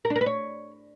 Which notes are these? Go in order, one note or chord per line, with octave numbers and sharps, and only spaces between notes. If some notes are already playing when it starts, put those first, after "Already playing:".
A#4
D4
A#4
B4
C#5